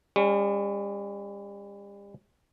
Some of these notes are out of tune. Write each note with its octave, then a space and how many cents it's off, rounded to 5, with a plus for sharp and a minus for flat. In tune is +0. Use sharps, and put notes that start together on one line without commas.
G3 +40 C#4 +10